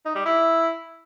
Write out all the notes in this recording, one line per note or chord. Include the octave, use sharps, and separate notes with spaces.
D#4
G3
E4